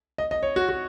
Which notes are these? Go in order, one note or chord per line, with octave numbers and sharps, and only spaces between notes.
D#5
D#5
C#5
F#4
F#4